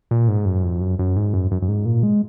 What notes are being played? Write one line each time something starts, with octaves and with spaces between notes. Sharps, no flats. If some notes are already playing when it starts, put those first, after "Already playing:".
A#2
G#2
F#2
F2
F#2
F#2
G#2
F#2
F#2
F#2
G#2
A#2
G#3